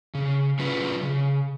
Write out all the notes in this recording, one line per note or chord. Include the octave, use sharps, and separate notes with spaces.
C#3
F#3 C#4 F4 B4
C#3